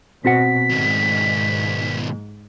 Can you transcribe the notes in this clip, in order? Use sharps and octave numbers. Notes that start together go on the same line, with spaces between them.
B2 C4 F#4 F#5 B6
G#2 B2 D#3